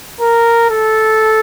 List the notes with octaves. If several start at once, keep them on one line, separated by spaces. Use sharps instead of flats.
A#4
A4